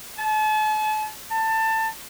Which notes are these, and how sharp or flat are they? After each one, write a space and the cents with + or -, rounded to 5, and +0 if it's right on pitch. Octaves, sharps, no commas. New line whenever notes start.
A5 -40
A5 +20